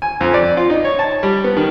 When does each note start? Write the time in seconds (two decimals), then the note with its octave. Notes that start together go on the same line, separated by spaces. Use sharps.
0.02 G#5
0.21 F2
0.34 D5
0.57 F4
0.70 D#4
0.85 C#5
0.99 A5
1.23 G3
1.44 B3
1.57 D#3